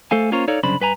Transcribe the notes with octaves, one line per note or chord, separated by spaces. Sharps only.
A3 A4 C5 F5 G#5
A#3 C#4 F4 A#4 C5 C#5
D#4 A4 C#5 D5 F5
C2 F#2 C#3 D4 C5 B5
G2 B4 G#5 A#5